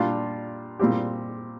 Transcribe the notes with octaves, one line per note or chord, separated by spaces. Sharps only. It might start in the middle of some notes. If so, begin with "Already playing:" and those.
Already playing: A#2 G3 D4 F4
A#2 G3 C4 G4